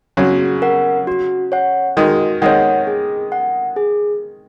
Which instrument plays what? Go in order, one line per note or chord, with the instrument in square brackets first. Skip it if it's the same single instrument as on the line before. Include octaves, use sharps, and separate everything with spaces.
[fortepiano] C#3 F#3 [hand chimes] F#4
[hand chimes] A#4 F#5
F#4
C#5 F#5
[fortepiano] D#3 G#3 [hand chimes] F#4
[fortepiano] D#3 G#3 [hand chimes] C#5 F#5
[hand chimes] G#4
F#5
G#4